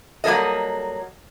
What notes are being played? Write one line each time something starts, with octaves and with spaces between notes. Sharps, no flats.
F#3 G3 A#3 A4 D#5